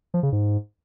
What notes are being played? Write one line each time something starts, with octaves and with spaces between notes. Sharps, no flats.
F3
C#3
G#2